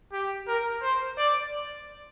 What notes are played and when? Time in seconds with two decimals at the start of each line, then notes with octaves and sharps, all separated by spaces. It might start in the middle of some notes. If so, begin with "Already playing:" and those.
0.12 G4
0.47 A#4
0.82 C5
1.18 D5